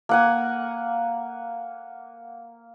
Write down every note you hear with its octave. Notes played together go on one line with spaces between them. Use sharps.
A#3 F#5 G#5